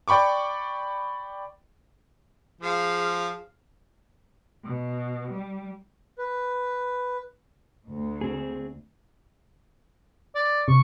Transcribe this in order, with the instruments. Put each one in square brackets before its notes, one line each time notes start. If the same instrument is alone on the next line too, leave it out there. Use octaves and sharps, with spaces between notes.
[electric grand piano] D5 G5 B5 C#6 D6
[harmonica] F3 [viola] G#4 F5
[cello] B2
G3
[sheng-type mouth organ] B4
[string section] D2
[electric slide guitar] C4 G#4
[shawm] D5
[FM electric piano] C3 [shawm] C#6